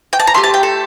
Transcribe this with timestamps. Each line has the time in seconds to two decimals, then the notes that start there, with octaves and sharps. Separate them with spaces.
0.13 G5
0.20 A5
0.27 A#5
0.34 A3 E4 G4 C6
0.44 A5
0.54 G5
0.63 A4